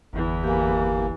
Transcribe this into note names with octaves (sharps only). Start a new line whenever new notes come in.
G1 E2 E3
A#3 G4 G#5